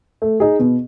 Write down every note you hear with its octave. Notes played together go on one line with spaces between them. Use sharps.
A3
D#4 G#4
B2